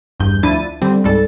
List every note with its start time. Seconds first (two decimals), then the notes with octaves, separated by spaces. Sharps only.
0.19 A1 E2 G2 G6
0.43 D2 F3 D4 E4 A6 D#7
0.81 D3 G3 C4
1.04 C#2 G#2 G3 A4 A6